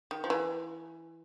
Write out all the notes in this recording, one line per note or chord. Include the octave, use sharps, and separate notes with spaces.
D#3
F3
E3